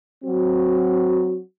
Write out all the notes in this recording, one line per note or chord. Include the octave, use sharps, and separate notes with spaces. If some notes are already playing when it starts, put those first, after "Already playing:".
F#3 C4 F#4